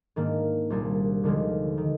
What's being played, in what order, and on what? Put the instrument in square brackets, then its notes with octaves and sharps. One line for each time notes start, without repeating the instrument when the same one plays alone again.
[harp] G#2 D#3 A#3 D4
C2 A#2 G3 D4 G#4
D#2 D3 F3 G#3
D#3